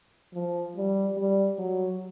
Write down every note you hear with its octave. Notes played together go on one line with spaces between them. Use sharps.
F3
G3
G3
F#3